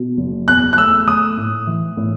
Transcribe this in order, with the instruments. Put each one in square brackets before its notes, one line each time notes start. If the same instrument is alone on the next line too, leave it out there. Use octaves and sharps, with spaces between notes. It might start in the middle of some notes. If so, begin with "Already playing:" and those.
Already playing: [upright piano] B2
F#1
[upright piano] E2 [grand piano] F#6
[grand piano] F#6
[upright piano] A3 [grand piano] E6
[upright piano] A3 [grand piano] D#6
[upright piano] A2
E3
A2